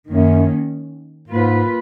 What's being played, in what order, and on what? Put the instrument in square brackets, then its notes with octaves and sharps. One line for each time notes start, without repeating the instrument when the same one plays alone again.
[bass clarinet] F#2 [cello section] D#3 A#3 C#4
[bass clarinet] G#2 [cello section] A#3 F4 B4